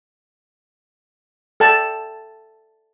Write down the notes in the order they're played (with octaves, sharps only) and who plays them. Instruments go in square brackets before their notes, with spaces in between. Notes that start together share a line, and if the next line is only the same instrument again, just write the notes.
[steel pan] A4 G5 A5